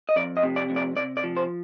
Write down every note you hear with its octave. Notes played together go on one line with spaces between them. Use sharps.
D#5
F2 D5
D#5
C3
D5
F2
D5
C3 D5
D5
F3
C5